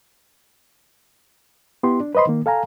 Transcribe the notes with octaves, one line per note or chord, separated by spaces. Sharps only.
B3 E4 G4 C6
D4
B4 C5 D#5 B5 C6
D#3 A#3
A4 F5 G#5 A#5